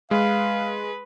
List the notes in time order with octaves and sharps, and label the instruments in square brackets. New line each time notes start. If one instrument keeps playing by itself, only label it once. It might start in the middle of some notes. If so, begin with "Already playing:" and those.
[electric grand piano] G#3 [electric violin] B4 [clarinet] F5